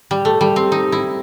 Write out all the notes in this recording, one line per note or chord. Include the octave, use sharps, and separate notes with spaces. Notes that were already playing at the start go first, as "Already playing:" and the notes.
G3
A3
G3
C4
D#4
E4